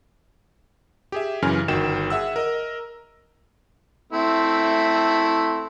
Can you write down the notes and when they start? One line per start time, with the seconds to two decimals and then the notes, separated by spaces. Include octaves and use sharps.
1.12 G4 G#4 E5
1.42 F#2 C#3 E3 G#5 F6
1.68 G1 D#3 F#4 G5 E7
2.10 G#4 E5 F#5 E6
2.36 A#4 D#5
4.13 A3 C4 E4